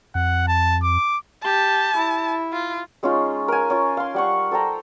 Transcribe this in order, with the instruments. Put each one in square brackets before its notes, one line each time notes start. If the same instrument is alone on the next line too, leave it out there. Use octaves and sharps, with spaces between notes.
[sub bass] F2 [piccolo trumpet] F#5
[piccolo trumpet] A5
D6
[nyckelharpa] G4 [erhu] A5
[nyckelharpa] E4
[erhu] F4
[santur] G#3 C#4 D#4 F4
A#4 G#5
C#4 F4
F5 C6
G3 F#5 C#6
A4 C5 G5 A#5